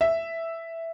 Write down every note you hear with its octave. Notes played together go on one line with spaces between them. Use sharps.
E5